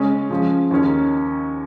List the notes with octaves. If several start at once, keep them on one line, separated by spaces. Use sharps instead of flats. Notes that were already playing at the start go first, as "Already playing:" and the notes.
Already playing: C#3 G#3 C#4
C#3 F3 G#3
D#2 D#3 C#4